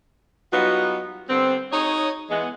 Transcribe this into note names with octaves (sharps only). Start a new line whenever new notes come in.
F#3 G3 B3 D#4 F4 F#4
D3 G3 B3 C4
D#4 F#4 G#4 C#5
E3 G#3 B3